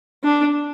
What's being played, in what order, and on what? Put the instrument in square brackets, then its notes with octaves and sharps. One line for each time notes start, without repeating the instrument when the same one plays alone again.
[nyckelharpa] D4